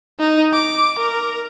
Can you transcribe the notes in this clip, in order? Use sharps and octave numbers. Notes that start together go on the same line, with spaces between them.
D#4
D6
A#4